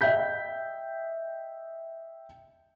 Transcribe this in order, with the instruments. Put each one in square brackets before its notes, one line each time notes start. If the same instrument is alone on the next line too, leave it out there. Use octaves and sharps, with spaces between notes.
[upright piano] D#5 E5 G5 G6 B6